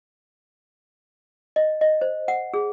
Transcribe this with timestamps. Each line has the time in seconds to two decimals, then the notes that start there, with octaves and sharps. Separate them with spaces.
1.56 D#5
1.81 D#5
2.01 C5
2.28 F#5
2.54 G#4